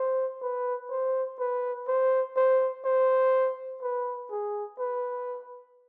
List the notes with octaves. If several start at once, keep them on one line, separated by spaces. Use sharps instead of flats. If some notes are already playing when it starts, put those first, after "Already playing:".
Already playing: C5
B4
C5
B4
C5
C5
C5
B4
G#4
B4